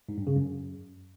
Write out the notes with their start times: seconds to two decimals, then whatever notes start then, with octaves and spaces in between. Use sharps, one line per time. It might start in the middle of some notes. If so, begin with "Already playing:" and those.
0.09 G#2
0.18 G2
0.27 C#3
0.36 F#2